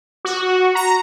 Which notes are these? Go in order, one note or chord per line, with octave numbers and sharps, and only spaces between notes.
F#4
A#5